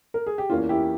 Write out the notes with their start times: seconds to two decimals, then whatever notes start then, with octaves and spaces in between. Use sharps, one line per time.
0.14 A#4
0.27 G#4
0.38 G4
0.50 E2 E3 A#3 C#4 F4
0.69 E4 G4